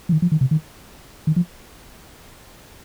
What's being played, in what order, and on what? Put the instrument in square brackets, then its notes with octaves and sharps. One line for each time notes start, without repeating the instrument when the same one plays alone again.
[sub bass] F3
D#3
F3
D#3
C3
D#3
D#3
F3